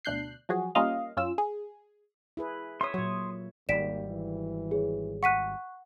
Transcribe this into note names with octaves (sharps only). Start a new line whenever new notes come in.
D2 B2 D4 F#6 G6 C7
F3 F#3 F#4 G#4
G3 A#3 C#4 F4 D#5 F5
F#2 C#4 F4 E6
G#4
E4 G#4 B4
C#5 E5 C6 D#6
A#2 F#3 C#5
G#1 D#2 G3 D5 B6 D7 E7
E3
G#4 C#5
F#5 C#6 F#6 B6 D#7